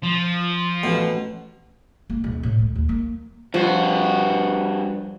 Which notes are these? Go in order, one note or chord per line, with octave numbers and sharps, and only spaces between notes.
F3
A1 B2
A#3
D#1
A2
D2
D#2
A#3
G2 F3 F#4